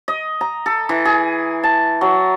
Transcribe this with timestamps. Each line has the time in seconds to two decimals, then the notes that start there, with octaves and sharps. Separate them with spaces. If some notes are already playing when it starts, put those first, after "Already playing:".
0.08 D#5
0.41 A#5
0.66 A4
0.89 E3
1.05 G#4
1.63 A5
2.01 F#3